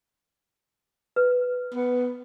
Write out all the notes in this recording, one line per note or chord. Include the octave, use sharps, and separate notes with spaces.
B4
B3